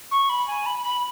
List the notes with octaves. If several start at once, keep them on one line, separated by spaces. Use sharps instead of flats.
C#6
B5
G#5
B5
B5